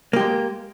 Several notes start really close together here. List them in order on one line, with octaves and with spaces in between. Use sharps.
A#3 G4 G#3